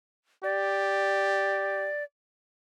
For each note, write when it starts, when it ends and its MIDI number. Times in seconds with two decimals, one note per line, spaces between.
0.44 1.89 67
0.44 2.03 74